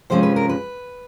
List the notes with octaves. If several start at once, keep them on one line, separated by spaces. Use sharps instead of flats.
C3 F3 G#3 C#4 C5
B4
A#4
B4